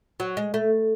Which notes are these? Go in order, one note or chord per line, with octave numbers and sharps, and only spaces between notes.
F#3
G#3
A3